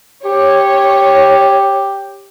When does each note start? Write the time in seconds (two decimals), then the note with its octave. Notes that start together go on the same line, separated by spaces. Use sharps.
0.25 G4 C#5